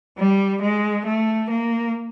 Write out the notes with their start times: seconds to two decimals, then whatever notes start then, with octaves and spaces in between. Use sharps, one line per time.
0.18 G3
0.62 G#3
1.06 A3
1.50 A#3